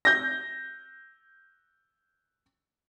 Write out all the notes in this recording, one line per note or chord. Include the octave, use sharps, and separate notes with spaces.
G6 A#6